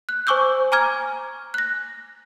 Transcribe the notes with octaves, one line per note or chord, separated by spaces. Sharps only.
F#6
C5 G#5 C#6 D6 E6 G6
G#5 A#5 D6 F6 G#6
F#6 A#6